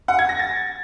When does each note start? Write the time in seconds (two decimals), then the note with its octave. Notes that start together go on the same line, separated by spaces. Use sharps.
0.08 F#5
0.19 G#6
0.29 A#6
0.39 A6